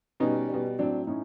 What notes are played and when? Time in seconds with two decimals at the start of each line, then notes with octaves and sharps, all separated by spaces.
0.20 B2 G3 C#4 D#4
0.49 B2 G3
0.79 A2 F#3 C4 D4
1.07 A2 C#4 D#4